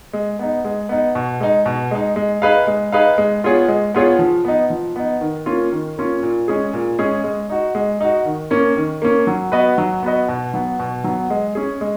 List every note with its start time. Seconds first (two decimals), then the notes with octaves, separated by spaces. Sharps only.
0.13 G#3
0.39 B3 D#4
0.65 G#3
0.89 B3 D#4
1.15 B2
1.40 G#3 D#4
1.66 B2
1.91 G#3 D#4
2.16 G#3
2.42 D#4 G#4 B4 F5
2.67 G#3
2.92 D#4 G#4 B4 F5
3.18 G#3
3.44 B3 F4 G#4 C#5
3.68 G#3
3.95 B3 F4 G#4 C#5
4.19 F3
4.45 B3 D#4
4.70 F3
4.96 B3 D#4
5.21 D#3
5.46 A#3 C#4 F4
5.72 D#3
5.97 A#3 C#4 F4
6.23 A#2
6.48 G#3 C#4 G#4
6.73 A#2
6.99 G#3 C#4 G#4
7.24 G#3
7.50 D#4 F#4
7.75 G#3
8.00 D#4 F#4
8.25 D#3
8.51 A#3 C#4
8.77 D#3
9.02 A#3 C#4
9.27 F#3
9.52 B3 F#4 B4 D#5
9.78 F#3
10.03 B3 F#4 B4 D#5
10.28 B2
10.54 F#3 B3
10.80 B2
11.04 F#3 B3
11.30 G#3
11.55 C#4 G#4
11.81 G#3